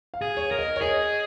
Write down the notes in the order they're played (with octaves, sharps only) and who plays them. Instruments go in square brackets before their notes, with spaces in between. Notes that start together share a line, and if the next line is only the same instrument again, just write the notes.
[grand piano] F5
[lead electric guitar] G#4
[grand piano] C#5
[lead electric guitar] A#4
[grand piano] D#5
C#5
[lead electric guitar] G#4 [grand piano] D#5